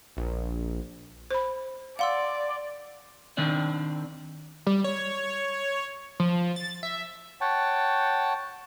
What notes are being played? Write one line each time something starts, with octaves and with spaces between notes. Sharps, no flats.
A#1
C5 B5
D5 F5 F#5 C6 E6
D#3 C4 D4 D5
G3
C#5
F3
A6
E5
C#5 F#5 G5 A5